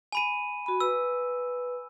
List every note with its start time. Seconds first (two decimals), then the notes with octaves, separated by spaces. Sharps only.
0.12 G#5 B5 D#7
0.66 F#4 B5
0.80 B4 E6